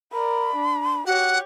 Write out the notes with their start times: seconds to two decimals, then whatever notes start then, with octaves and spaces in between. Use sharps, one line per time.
0.12 A#4 D5 B5
0.55 D4
1.06 F#4 G4 C#5 F#5